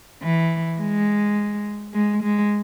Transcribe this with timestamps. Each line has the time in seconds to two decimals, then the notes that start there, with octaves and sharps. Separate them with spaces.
0.22 E3
0.79 G#3
1.94 G#3
2.23 G#3